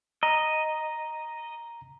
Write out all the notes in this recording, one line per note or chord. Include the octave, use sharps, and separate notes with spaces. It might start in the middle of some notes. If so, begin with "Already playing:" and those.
D#5 A#5